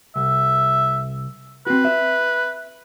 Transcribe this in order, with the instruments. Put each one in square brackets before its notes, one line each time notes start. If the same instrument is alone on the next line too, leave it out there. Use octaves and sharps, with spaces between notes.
[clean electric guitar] C2 [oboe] E5
[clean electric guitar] C4 F#4 [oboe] B4
[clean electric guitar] E5